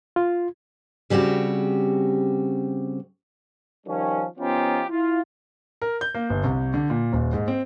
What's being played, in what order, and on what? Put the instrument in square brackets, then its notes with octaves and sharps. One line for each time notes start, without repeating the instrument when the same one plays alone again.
[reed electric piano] F4
[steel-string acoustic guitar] C#3 G3 C4 F#4 G4
[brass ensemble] D#3 F3 G3 C#4
F3 B3 C#4 D#4 F4 G4
E4 F4
[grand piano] A#4
G6
A#3
G1
C2
D3
A#2
D#1
G#2
C4